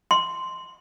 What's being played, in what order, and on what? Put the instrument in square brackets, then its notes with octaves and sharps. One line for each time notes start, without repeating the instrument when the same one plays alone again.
[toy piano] C6